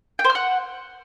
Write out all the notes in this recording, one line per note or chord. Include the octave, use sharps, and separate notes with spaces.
G5
C5
F6
F#5